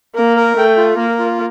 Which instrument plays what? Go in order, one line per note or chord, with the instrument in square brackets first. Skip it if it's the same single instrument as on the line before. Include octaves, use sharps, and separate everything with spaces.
[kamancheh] A#3 [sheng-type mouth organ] A#4
[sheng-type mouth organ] A#4
[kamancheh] A3 [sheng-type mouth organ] G5
[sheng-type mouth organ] F4
[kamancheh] A#3 [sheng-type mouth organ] A#4
[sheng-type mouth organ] F4